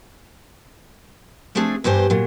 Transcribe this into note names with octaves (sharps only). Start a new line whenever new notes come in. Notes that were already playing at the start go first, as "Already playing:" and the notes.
F3 A3 C4 D4 G#4
E2 G2 G4 C5 G#5
A#2 F#3